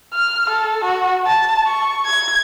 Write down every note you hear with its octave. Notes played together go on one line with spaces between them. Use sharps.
F6
A4
F#4
A5
C#6
G#6